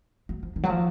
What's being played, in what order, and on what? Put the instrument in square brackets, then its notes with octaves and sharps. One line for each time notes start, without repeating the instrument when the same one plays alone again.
[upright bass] F#3
F3
D#3
F#3
F3